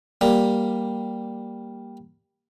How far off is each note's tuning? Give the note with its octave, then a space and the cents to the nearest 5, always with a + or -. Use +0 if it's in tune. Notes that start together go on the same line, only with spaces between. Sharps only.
G3 +0 A#3 +5